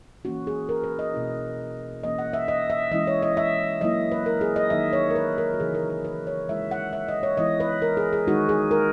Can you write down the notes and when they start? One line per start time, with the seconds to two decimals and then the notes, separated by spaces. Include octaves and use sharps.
0.25 E3 A#3 C#4 F#4
0.47 G#4
0.69 A#4
0.84 B4
0.99 D#5
1.14 B2 A#3 C#4 E4
2.04 E3 A#3 C#4 D#5
2.19 F#5
2.33 E5
2.48 D#5
2.70 E5
2.92 E3 G#3 C#4 E4 D#5
3.07 C#5
3.23 D#5
3.37 E5
3.81 F#3 A#3 E4 D#5
4.11 B4
4.26 A#4
4.41 G#4
4.56 D#5
4.70 D#3 F#3 A#3 D#4 E5
4.93 C#5
5.10 A#4
5.15 B4
5.38 A#4
5.54 F#4
5.60 C#3 E3 A#3 D#4 G#4
5.75 A#4
5.90 A#4
6.05 B4
6.27 C#5
6.48 E3 G#3 C#4 E4 E5
6.71 F#5
6.93 E5
7.08 D#5
7.23 C#5
7.37 E3 G#3 B3 E4 D#5
7.60 B4
7.82 A#4
7.97 G#4
8.13 G#4
8.27 D#3 G#3 D#4 F#4
8.49 G#4
8.71 A#4